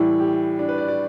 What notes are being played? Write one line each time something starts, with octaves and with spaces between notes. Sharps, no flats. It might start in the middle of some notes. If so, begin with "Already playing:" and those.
Already playing: A2 E3 G3 E4
G4
D4
B4
D5
D5